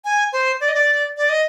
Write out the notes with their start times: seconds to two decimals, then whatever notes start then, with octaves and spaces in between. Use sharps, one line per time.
0.05 G#5
0.33 C5
0.61 D5
0.68 D#5
0.74 D5
1.17 D5
1.29 D#5